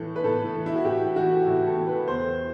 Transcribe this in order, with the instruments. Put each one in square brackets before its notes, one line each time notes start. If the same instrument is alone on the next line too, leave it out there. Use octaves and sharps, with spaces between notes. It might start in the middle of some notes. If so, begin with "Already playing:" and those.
Already playing: [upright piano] A2 E3 A4
B4
A2 A4
E3
E4
F#4
A2 G4
E3 F#4
A2 E4
A4
E3
B4
E2 C5